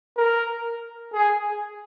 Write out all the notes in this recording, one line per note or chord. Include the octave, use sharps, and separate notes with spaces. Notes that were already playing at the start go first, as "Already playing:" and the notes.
A#4
G#4